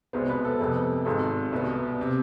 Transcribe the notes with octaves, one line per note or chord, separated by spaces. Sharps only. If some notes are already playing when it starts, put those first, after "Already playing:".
C2 B2 G#3 B3 C5
B4
A4
F1 F2 C3 G#3 B3
G#1 G#2 G#3 A4
C2 B2 B3
C3